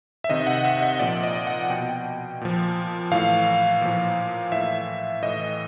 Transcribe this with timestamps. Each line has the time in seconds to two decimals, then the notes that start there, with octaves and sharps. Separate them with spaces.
0.24 E5
0.29 C3 D#3 D#5
0.47 F#5
0.64 E5
0.82 D#5
0.99 A#2 F3 D5
1.23 D#5
1.47 F#5
1.70 B2 G5
2.41 A#2 F3
3.11 A2 E3 F5
3.81 A#2 F3
4.52 A2 E3 E5
5.22 A2 E3 D#5